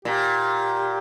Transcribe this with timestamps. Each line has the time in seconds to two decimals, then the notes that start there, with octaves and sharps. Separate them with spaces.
0.05 A#2 G4